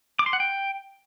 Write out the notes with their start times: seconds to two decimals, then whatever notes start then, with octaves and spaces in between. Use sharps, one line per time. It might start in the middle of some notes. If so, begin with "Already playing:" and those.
0.19 D6
0.26 C6
0.33 F#5
0.40 G5